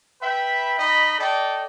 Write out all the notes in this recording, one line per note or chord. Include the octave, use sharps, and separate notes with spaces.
B4 E5 G5 B5
D#4 D#5 B5
A4 D5 D#5 G5